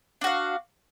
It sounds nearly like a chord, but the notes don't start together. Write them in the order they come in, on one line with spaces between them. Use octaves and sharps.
D4 F#4 F5